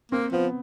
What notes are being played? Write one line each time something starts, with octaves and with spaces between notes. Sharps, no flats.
A#3 C4
F3 B3